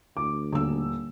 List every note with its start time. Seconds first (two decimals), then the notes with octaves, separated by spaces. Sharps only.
0.17 D2 D6
0.53 D#1 D3 E6